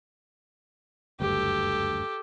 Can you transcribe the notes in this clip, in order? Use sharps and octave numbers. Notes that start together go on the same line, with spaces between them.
F#1 D2 G2 G4 A4